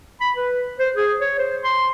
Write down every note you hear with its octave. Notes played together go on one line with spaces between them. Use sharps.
B5
B4
C5
G#4
C#5
C5
C6